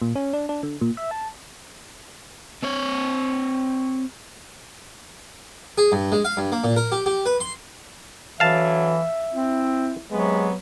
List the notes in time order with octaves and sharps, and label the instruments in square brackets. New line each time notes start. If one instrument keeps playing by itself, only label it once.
[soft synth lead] A#2
C#4
D4
D4
D3
A#2
E5
A5
[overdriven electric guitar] C4 C#5
[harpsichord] G#4
G2
G#3
F5
G2
A#3
A#2
A#4
G4
G4
B4
C6
[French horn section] D3 F#3 [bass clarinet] E3 [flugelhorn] E5 [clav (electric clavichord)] F5 A5
[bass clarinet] C4 [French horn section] E4
[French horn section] C3 B3 [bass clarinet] F#3 [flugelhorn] G#3